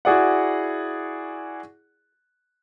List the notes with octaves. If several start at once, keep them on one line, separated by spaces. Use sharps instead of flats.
E4 F#4 G#4 D5 F#5